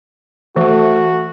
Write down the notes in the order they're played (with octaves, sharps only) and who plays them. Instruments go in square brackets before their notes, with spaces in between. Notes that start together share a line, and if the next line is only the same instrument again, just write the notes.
[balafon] E3 [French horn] A3 [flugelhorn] F#4